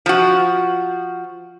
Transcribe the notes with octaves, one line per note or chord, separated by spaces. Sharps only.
F3 F#4